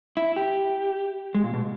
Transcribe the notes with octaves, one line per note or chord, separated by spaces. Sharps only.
E4
G4
G#3
A#2
B2